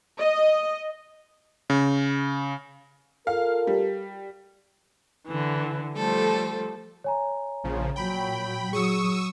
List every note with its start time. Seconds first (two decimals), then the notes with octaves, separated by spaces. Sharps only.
0.19 D#5
1.70 C#3
3.27 F4 A4 A#4 F5
3.67 G3
5.27 D3 E3
5.94 F3 G3 A3 A4 C5
7.04 C#5 G#5 A#5
7.64 A#1 C#3 F3
7.96 A#2 F#3 G5 B5
8.73 F#3 G#4 C#6 D#6 E6 C#7